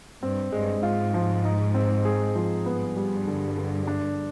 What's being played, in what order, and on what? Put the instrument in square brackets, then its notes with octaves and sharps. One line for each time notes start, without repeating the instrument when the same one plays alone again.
[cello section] G2 [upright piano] C4
[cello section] G2 [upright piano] G#3
[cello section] G#2 [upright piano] F4
[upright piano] F3
D#4
C4
G#4
F3
[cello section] G2 [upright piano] B3
[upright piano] G3
D3
D3
D4